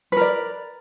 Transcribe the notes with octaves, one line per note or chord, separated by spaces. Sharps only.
A#4 B4 D5